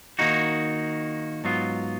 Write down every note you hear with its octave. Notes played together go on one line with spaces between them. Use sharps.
D#3 A#3 D#4 F#4
G#2 F#3 B3 F4